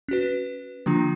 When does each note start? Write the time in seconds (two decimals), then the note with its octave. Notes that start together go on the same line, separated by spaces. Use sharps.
0.08 C#4 F#4 B4
0.86 D3 F3 A#3 D4 F4